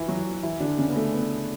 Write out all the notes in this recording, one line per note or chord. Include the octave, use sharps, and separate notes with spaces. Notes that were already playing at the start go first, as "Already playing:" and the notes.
Already playing: E3 E4
F#3 F#4
E3 E4
D3 D4
C#3 C#4
B3
A3
B3